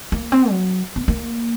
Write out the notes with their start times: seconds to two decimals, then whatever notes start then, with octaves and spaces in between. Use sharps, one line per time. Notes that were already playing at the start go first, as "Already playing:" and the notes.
0.12 A#3
0.32 C4
0.50 F#3
0.96 B3
1.08 A#3